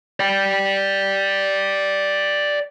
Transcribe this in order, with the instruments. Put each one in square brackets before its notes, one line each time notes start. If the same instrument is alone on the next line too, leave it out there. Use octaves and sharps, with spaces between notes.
[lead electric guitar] D5 G5